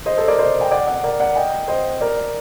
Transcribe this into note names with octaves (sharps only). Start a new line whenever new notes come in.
C5 D#5
A4 C5
A#4 D5
C5 D#5
G5
D5 F#5
D5 F#5
A#4 D5
D5 F#5
D#5 G5
C5 D#5
A#4 D5